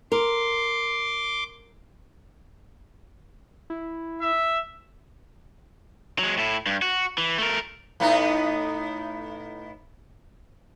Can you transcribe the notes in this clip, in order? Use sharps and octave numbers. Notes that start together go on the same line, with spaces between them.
A#4 C6 D6
E4
E5
F#3 G#3
A2 E4
G2
F#4
E3
A3 A#4
A2 B3 D#4